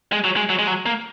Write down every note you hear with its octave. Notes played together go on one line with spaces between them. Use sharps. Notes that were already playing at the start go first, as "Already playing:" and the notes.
G#3
F#3
G#3
F#3
G#3
F#3
A#3